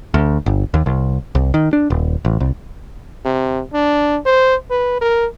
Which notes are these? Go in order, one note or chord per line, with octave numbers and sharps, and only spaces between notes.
D2
G1
D#2
C2
C2
D#3
D4
D#1
A1
C2
C3
D4
C5
B4
A#4